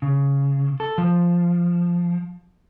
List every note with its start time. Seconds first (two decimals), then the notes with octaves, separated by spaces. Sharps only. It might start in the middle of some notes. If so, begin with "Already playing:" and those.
0.02 C#3
0.80 A4
0.98 F3